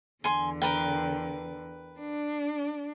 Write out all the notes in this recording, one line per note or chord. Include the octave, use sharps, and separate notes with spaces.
E2 D3 G#5 C6
A#4 B4 G5
D4